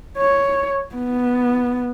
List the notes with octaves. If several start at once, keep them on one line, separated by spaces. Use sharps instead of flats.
C#5
B3